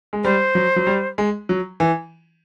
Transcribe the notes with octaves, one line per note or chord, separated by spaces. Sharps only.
G#3
G3 C5
F#3
F#3
G3
G#3
F#3
E3